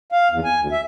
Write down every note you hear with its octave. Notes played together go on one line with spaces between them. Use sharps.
F5
E2
G#5
D2
E5